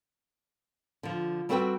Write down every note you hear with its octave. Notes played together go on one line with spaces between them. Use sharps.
D3 F3
G3 C4 F#4 A4 B4 G5